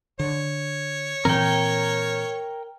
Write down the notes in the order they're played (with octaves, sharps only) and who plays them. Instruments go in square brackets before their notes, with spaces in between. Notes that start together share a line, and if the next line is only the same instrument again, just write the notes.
[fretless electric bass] D3 [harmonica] C#5
[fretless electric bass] A#2 E3 C4 [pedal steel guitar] A#4 G5